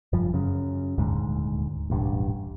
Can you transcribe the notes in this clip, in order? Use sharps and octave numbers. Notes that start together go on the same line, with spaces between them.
F1 G2 F3
F#2 C#3
D#1 D2 G#2
E1 A1 G2